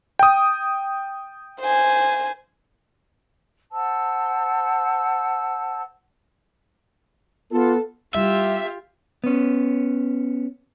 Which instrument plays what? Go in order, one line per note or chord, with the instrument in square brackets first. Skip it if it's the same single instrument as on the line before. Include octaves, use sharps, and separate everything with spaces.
[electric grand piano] G5 D#6
[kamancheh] C5 G#5
[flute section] C5 F#5 A5 E6
[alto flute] B3 [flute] F4 [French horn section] A4
[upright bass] G3 E4 [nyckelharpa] F4 G4 [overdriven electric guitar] E5
[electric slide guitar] B3 C#4